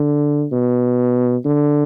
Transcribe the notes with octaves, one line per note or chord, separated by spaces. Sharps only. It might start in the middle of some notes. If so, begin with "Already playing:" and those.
Already playing: D3
B2
D3